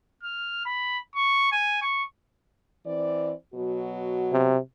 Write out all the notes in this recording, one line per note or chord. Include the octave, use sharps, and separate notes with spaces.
F6
B5
C#6
G#5
C#6
E3 C4 D5
B2 F#3 F#4
C3